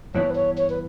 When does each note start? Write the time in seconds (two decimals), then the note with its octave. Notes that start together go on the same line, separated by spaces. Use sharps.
0.15 G2 E3 B3 C#5
0.30 B4
0.35 C#5
0.57 C#5
0.70 B4